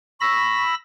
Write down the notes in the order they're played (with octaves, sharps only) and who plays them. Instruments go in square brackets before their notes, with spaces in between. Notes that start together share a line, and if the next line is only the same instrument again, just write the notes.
[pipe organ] B5 E6 A#6 [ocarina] C#6